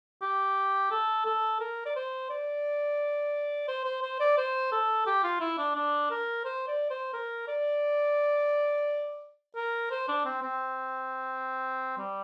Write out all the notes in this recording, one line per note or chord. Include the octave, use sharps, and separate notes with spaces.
G4
A4
A4
A#4
D5
C5
D5
C5
C5
C5
D5
C5
A4
G4
F4
E4
D4
D4
A#4
C5
D5
C5
A#4
D5
A#4
C5
D4
C4
C4
G3